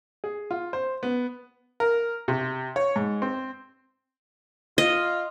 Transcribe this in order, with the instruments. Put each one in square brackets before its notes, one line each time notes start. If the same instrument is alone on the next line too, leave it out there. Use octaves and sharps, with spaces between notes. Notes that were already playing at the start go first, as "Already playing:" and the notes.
[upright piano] G#4
F4
C5
B3
[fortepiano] A#4
C3
C#5
G#2
C4
[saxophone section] F4 [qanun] D#5